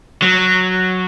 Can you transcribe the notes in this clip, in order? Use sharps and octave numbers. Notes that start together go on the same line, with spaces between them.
F#3